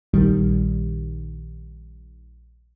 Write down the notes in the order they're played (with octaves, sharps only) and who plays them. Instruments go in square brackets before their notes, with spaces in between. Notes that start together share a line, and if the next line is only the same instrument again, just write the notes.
[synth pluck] A#1 D#3 G3